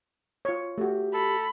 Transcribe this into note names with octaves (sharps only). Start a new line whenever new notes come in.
F4 C#5
A3 F#4 G4
A4 B5